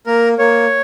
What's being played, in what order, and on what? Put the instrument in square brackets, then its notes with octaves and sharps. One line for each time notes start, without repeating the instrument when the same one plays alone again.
[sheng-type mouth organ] A#3 A#4
A#3 C#5